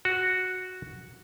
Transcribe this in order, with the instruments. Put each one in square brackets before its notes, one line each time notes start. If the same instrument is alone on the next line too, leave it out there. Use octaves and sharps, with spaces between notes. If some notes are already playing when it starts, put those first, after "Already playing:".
[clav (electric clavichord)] F#4